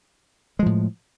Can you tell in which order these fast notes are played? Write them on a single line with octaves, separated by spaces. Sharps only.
G#3 F3 A2